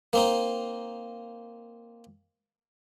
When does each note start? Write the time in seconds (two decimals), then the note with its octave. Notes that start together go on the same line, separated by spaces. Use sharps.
0.13 A#3 C4 D#4